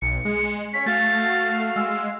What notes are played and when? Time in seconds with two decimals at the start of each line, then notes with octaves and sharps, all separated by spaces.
0.02 B1 C#7
0.25 G#3
0.74 C#4 C#5 B6
0.86 A3 F#4 F5 A6
1.76 G#3 E6